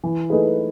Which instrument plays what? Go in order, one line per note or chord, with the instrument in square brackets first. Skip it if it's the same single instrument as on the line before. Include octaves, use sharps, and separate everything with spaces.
[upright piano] E3
A3 D#4 G#4 B4